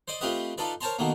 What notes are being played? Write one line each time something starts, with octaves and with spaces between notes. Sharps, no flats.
C5 D5 D#5 D6
A3 C4 F4 G4 B4 D#5
D#4 F4 A4 B4 D5
A#4 C5 C#5 A5 A#5 C6
B2 D#3 A3 A#3